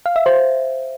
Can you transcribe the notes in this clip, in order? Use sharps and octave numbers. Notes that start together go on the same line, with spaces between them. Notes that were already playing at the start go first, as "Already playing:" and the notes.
F5
E5
C5